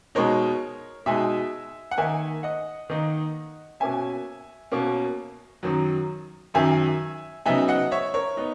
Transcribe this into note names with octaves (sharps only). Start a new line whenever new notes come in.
B2 G#3 D#4 A#4 C#5
B2 G#3 D#4 E5 G#5
F#5
D#3 A#3 D#4 E5 G#5
D#5 F#5
D#3 A#3 D#4
B2 A#3 C#4 E5 G#5
B2 A#3 C#4
F#2 D#3 F#3
F#2 D#3 F#3 E5 G#5
C#3 F#3 B3 D#4 E5 G#5
D#5 F#5
C#5 E5
A#4 C#5
B3 D#4